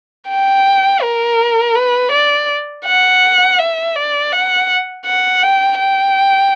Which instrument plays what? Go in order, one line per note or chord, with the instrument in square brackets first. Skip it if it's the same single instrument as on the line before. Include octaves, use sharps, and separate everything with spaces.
[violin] G5
A#4
B4
D5
F#5
E5
D5
F#5
F#5
G5
G5